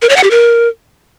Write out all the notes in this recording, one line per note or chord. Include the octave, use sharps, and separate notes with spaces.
A#4
C#5
F#5
G4
A#4